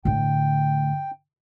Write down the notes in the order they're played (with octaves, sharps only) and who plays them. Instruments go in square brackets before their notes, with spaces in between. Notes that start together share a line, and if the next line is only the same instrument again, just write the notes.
[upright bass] A2 D3 [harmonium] G5